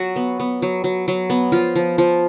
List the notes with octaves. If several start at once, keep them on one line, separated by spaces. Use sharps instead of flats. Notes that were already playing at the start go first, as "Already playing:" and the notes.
Already playing: F#3 F#4
B3
B3
F#3
F#3
F#3
B3
F3 F4
F3
F3